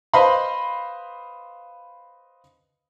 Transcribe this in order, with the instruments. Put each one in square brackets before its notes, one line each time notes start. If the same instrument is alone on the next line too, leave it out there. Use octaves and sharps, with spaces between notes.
[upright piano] B4 C5 D#5 F5 B5 C6